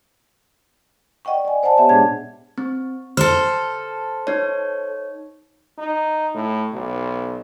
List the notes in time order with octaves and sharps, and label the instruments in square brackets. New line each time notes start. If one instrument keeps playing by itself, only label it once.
[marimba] D5 D#5 F#5 G5 C#6
D5 G#5
C5 D5 F#5 G#5 A5
B3 G4 C#5 E5 F#5 A5
A#2 G#3 D4 G#4 A5 G#6
[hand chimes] C4
[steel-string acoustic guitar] A4 C5 [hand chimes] F6
[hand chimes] D#4 C#5
[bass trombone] D#4
A2
B1